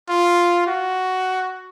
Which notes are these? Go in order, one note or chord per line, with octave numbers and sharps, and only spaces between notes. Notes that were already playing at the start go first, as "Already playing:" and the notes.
F4
F#4